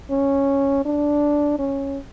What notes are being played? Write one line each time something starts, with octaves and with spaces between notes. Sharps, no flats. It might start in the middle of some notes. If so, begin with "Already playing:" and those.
C#4
D4
C#4